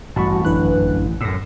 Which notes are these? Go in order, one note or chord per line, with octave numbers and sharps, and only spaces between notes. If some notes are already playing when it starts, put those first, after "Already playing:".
A1 G2 F#4 A5 B5 C#6
G1 F#2 D3 E3 B4 F#6
F#2 A2 E6 A#6